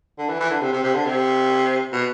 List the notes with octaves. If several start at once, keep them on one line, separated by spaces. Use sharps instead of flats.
D3
E3
E3
D3
C3
C3
C3
D3
C3
B2